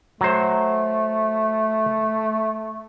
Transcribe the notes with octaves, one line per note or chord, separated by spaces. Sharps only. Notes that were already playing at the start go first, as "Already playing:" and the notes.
F#3 A3 C5